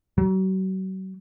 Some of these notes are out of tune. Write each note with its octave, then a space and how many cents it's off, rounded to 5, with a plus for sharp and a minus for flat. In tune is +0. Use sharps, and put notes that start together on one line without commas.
F#3 +40